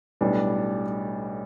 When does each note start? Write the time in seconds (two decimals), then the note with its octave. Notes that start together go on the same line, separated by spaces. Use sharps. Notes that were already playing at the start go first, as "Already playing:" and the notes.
0.21 B1 A2 G3 B3 D4